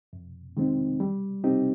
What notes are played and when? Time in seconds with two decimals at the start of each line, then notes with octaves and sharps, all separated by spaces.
0.13 F2
0.57 D#3 G#3 C4 D#4
1.00 G3
1.44 C4 D#4 G4